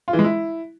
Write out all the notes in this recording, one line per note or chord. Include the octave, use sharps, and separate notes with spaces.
F4
E3
G#3
E4